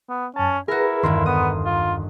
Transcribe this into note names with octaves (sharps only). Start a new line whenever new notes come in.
B3
F#2 C#4 A5
E4 F#4 G#4 A#4 B4
G1 E2 G2 D#3 C6
B3 D#6
F4